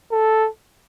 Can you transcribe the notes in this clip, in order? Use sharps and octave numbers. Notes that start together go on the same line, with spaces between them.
A4